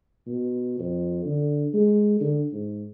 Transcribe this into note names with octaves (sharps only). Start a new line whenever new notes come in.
B2
F2
D3
G#3
D3
G#2